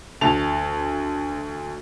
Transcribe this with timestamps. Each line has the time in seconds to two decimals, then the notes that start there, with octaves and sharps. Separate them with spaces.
0.21 D2 A5 F7